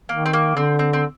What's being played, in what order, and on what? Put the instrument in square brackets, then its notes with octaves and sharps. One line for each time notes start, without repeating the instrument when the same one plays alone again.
[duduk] D#3 [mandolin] A#3
[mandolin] C4
A#3
[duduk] D3 [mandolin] C4
[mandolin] C4
C4